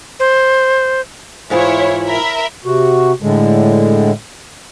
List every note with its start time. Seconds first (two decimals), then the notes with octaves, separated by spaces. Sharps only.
0.20 C5
1.50 G#2 E3 E4 F4 C#5
2.05 A#4 E5 B5
2.65 C3 F#4
3.22 A2 D3 G#3